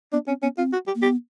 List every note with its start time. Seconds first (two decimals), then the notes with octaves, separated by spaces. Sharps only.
0.13 B3 D4
0.28 C4 C#4
0.43 B3 C#4
0.58 C4 F4
0.73 F#4
0.88 G4
0.95 A#3
1.02 B3 G4